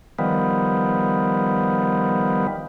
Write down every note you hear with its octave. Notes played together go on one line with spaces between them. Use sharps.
D#3 F3 G3 B3